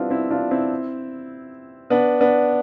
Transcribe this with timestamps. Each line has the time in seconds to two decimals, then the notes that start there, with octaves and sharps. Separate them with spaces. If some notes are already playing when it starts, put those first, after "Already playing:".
Already playing: G3 B3 C4 D4 E4 F4
0.10 C4 E4
0.30 D4 F4
0.51 C4 E4
1.90 B3 D4
2.20 B3 D4